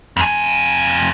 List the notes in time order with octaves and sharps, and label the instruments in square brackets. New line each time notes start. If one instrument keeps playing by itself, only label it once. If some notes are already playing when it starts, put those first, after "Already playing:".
[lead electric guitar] F2 G#5